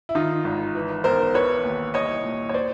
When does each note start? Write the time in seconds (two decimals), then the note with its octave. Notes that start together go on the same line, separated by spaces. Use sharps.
0.09 E4
0.15 D#3 D#4 F4
0.44 G#1
0.75 E3
1.04 B1 A#4 C5
1.34 E3 B4 C#5
1.64 D#2
1.94 C2 C#5 D#5
2.24 A#2
2.49 C#5
2.54 C5 D5